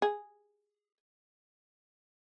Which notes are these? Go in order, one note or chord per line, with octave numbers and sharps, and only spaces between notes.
G#4